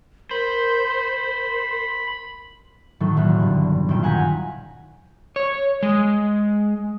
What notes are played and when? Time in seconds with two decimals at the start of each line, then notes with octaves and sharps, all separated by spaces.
0.31 A#4 C5 B5
3.00 A2 D#3 F#3 A3 F#4 A4
3.17 E1 B1 A#3 E5 F#6
3.39 G2 D3
3.89 D#1 B2 D#3 G5 E7
4.03 F5 F#5 G#5 A#5 G6 B6
5.36 C#5
5.83 G#3